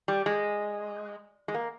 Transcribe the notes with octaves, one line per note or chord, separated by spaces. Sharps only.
G3
G#3
G#3
A#3